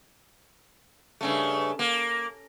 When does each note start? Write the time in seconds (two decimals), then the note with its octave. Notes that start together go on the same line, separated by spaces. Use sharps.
1.21 G2 C#3 A3
1.79 A#3